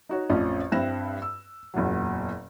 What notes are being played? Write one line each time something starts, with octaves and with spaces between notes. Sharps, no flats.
D#4 F#4 C#5
A1 F2 F3 C#4 D5 D#5
G2 C4 E4 F#6 A#6 E7
E6
F#1 E2 A#2 F#3